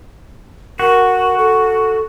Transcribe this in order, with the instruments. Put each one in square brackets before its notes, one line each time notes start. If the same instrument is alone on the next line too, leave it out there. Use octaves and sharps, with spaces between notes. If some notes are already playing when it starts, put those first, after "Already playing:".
[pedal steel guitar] F#4 [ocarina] A#4
[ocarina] A4